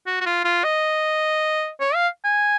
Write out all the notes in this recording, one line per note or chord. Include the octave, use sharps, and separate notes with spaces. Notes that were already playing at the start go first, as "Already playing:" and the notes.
F#4
F#4
F4
F4
D#5
C#5
F5
G#5